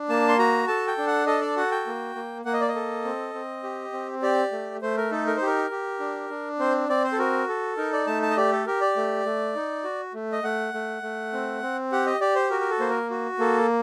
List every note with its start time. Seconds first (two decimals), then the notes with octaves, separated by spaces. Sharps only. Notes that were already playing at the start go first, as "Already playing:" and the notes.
Already playing: D4
0.09 A#3 A5
0.29 C6
0.39 F#4 A#5
0.67 A4 A5
0.87 G5
0.98 D4
1.07 F#5
1.27 A4 D#5
1.41 D5
1.57 F#4 F#5
1.71 G5
1.87 A#3
2.15 A#3
2.45 A#3 F#5
2.53 D#5
2.61 D5
2.68 D#5
2.75 A4
3.05 C4
3.34 C4
3.63 G4
3.93 C4
4.22 G4 D5
4.52 A3
4.82 A3 C5
4.97 A#4
5.11 D#4 A4
5.27 A#4
5.37 G4 C5
5.47 A#4
5.71 G4
6.00 D4
6.30 D4
6.59 C4 C5
6.89 C4 D5
7.04 C5
7.12 A4
7.19 F#4 A#4
7.48 A4
7.77 D#4 A#4
7.93 D5
8.07 A3 A5
8.23 A5
8.30 D#5
8.37 G4 D5
8.52 A4
8.67 G4 A#4
8.81 D5
8.96 A3
9.25 A3
9.55 D#4
9.84 F#4
10.14 A3
10.32 D#5
10.43 A3 F#5
10.74 A3
11.02 A3
11.33 C4
11.62 C4
11.92 G4 F#5
12.06 D#5
12.20 G4 D5
12.35 C5
12.51 F#4 A#4
12.61 A#4
12.71 A4
12.80 A#3 C5
12.89 A#4
13.10 F#4
13.39 A#3 A4